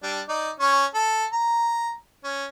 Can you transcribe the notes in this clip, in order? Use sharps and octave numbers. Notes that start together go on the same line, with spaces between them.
G3 D4
D#4 D5
C#4 C#6
A4
A#5
C#4